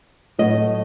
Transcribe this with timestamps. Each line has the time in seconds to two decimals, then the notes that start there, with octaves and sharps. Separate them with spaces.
0.39 A2 F#3 D#5